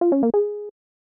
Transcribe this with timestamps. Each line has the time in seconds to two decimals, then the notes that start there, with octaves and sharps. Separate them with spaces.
0.01 F4
0.12 C#4
0.23 A#3
0.34 G#4